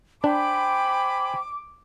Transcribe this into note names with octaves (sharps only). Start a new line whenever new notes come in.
D4 C5 G5 G#5 B5 D6